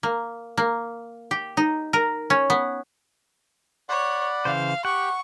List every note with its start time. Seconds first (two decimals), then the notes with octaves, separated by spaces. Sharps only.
0.03 A#3
0.57 A#3
1.31 G4
1.57 D#4
1.93 A#4
2.30 C#4
2.50 B3
3.89 C#5 D5 F#5 B5
4.45 C#3 E3 C5 F5
4.85 G4 F#5 G5 C#6